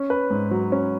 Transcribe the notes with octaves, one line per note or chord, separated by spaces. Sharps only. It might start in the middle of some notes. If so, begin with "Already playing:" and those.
Already playing: C#4
B4
G#2
F#3
C#4